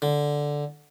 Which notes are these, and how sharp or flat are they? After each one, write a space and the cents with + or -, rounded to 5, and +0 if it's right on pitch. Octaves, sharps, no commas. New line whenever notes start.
D3 -5